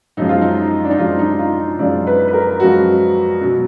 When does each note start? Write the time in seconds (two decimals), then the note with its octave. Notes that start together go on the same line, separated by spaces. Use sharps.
0.17 F#2 F3 G#3 D#4
0.29 F4
0.42 D#4
0.84 D4
0.91 D#4
0.98 F#2 F3 G#3 F4
1.19 D#4
1.39 F4
1.59 D#4
1.79 F#2 F3 G#3 D5
2.07 B4
2.28 B4
2.33 A#4
2.60 F#2 F3 G#3 F#4
3.41 B2 F#3